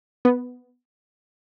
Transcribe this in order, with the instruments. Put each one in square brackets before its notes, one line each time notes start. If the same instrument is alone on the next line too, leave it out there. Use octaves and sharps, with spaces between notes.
[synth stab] B3